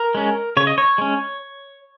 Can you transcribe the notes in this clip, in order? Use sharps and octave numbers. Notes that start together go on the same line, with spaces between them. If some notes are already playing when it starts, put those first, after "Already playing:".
Already playing: A#4
G#3 C#4
C#3 C#5
D#5
C#5
G#3 C#4